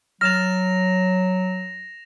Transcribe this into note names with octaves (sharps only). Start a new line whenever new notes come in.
F#3 F6 A6 A#6 E7 F7